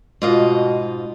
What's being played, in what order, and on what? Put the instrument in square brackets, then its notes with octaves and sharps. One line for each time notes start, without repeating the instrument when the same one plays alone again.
[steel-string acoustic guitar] G#2 F4 D#5 [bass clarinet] B2